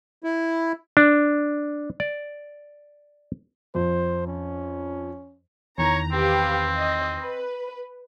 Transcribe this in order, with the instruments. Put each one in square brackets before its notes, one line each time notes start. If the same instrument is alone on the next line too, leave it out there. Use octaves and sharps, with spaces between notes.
[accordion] E4
[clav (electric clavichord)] D4
D5
[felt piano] F2 [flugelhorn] C5
[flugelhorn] C#4
[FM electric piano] E2 D#3 E3 [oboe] C#5 [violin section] A#5
[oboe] C4 [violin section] G4 B4 F5
[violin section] D#5
B4